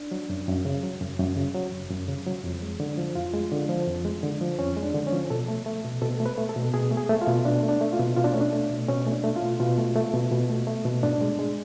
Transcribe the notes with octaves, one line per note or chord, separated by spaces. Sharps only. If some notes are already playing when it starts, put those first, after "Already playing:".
Already playing: D4
F#3
F#2
F#2
C#3
F#3
F#2
F#2
C#3
F#3
F#2
F#2
C#3
F#3
F2
G#3
D3
F3
F2 F4
G#3
D3
F3
F2
G#3
D3
F3
F2 C#4
G#3
D4
D3
C#4
F3
B2 A4
A3
A3
B2
B2 A4
A3
B4
A3
A4
B2
B2 G#4
A3
G#4
A3
F4
B2
B2 D4
A3
D4
A3
F4
B2
B2 F4
D4
A3 C#4
D4
A3
B2
B2 C#4
A3
D4
A3
F4
B2
B2 F4
A3
A3
B2
B2
A3
A3
B2
G#2 D4
G#3
G#3